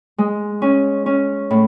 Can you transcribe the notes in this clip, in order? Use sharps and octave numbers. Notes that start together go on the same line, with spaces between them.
G#3
C#4
C#4
A2